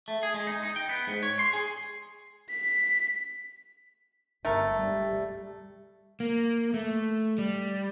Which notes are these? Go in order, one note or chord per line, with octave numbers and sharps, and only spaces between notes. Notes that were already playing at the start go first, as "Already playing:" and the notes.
A3
G#4
G#3
D#4
D#4
G5
B3
G#2
C#5
C6
G#4
B6
G1 A3 A#4
G3
A#3
A3
G3